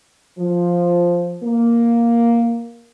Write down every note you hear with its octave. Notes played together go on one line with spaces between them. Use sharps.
F3
A#3